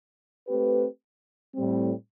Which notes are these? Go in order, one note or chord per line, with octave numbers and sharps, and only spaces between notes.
A3 C4 G4 B4
A2 G3 C4